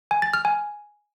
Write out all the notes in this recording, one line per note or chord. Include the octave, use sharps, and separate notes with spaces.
G#5
A6
F6
G#5